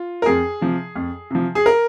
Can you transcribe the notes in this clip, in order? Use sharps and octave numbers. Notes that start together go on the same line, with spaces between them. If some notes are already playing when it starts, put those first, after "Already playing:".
Already playing: F4
A#4
F2 G#4
C3 F3
F2
C3 F3
G#4
A#4